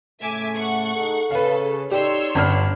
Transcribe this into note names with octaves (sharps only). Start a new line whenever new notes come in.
A2 C#3 A3 E5 G#5 D6
F#5 C#6
D#4 G#4 A4
C#3 A4 B4 F5
D#4 G4 C#5 D5 C6 E6
G1 G2 F6